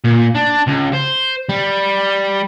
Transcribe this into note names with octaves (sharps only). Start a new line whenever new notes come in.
A#2
D4
C#2
C5
G3